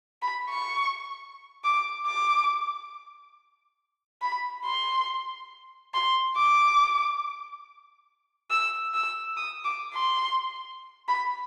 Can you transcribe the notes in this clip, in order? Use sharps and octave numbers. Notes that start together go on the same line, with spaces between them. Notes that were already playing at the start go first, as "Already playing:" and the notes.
B5
C#6
D6
D6
B5
C6
C6
D6
E6
E6
D#6
D6
C6
B5